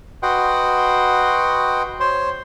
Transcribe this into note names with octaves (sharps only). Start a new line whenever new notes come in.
F#4 B4 D#5 F#5 G5 C6
C5 C#5 C6